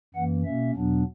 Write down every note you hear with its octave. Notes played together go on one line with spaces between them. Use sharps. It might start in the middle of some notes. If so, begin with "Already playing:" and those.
F#2 E3 A#3 F#5
B2 A#3 C#4 E5
E2 B2 F#3 B3 D4